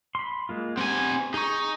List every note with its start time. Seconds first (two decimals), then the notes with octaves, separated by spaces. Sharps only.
0.15 B5 C6
0.49 G#3 A#3 F4
0.77 B3 C4 G4 G#5
1.34 D#4 G#4 C#6